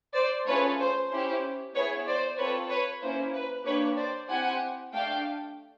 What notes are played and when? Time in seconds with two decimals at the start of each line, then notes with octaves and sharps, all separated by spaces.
0.15 C5 D5
0.47 A3 C#4 F4 G#4 B4 C#5
0.79 C5
1.10 C#4 E4 G4 C5
1.74 B3 E4 G#4 B4 C#5
2.06 C5 D5
2.38 C4 F4 A4 B4 C#5
2.69 B4 C#5
3.01 A#3 C#4 E4 C5
3.34 B4
3.65 A#3 D4 G4 B4 C#5
3.97 C5 D5
4.29 C4 E4 G4 F#5 G#5
4.93 A3 D4 G4 F5 G5